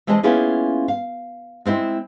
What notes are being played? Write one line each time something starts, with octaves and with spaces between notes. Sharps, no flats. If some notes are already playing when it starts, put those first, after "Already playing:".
E3 G#3 C4 D4 D#5 A5
A#3 B3 C#4 E4 F4 G#4
F5
G#3 C4 E4 D#5